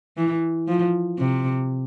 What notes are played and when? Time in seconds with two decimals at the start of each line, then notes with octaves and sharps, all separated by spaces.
0.17 E3
0.68 F3
1.19 C3